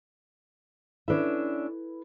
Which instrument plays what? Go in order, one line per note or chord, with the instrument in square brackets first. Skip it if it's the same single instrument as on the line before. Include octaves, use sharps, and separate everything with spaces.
[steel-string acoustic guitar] C#4 D4 E5 [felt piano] E4 A4 B4